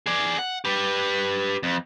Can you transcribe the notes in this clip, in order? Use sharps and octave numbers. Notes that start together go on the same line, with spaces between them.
G#4 D5
F#5
G4 B4
F2